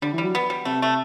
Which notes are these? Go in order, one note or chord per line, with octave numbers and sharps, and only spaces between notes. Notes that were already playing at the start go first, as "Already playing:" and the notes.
D3 G3
E3 G3
F#3
B3
G3
C3 A3
A3